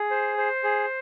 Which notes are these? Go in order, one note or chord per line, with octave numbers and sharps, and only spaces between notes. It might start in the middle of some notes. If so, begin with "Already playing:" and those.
Already playing: G#4
C5
C5
G#4